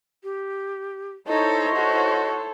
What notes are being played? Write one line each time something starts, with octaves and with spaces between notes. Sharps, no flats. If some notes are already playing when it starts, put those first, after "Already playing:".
G4
D#4 E4 A4 C5 C#5 D#5
F#4 A4